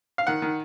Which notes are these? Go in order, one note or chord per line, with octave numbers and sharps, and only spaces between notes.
F5
D#3 F#5
D#3